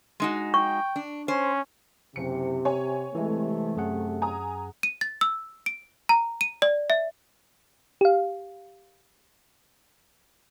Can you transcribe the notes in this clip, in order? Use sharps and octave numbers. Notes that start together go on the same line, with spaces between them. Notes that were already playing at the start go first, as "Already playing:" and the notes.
G#3 D#4 F#4
G5 C#6
D4
C#4 C5
F#1 C3 C#7
C#5 G#5
C3 E3 G#3 A3
F#2 G#4 F#5
G#5 A#5 D#6
D#7
A6
E6
D7
A#5
D#7
D5
E5
G4 F5